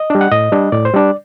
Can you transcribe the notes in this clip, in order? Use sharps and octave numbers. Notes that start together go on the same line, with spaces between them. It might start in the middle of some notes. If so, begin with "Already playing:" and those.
Already playing: D#5
G3 D4
F#5
A2 D#5
G3 D4
A2 D5
C5
G3 D4 D5